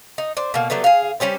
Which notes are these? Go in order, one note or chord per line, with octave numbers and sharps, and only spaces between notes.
D#4
D4 C5
B2 A#3
F#3 G3 A3 B3
G#4 F5
G3 C#4 G4 C5